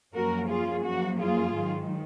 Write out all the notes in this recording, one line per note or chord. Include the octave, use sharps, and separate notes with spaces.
F#2 F3 A#3 C#4 F#4 A#4
F4 G#4
F#2 F3 A#3 F#4
F4 G#4
G#2 D#3 F#3